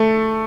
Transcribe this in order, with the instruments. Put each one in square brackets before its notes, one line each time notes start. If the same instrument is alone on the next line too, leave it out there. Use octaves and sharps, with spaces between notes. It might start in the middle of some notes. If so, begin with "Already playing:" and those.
Already playing: [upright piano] A3 A4